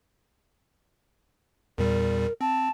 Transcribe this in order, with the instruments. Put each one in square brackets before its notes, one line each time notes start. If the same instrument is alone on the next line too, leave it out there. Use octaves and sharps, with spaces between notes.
[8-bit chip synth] E2 A#2 G3 [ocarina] A#4
[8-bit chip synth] C4 [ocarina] A5